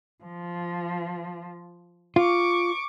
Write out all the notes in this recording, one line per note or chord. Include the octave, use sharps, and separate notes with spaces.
F3
F4 C#6 D6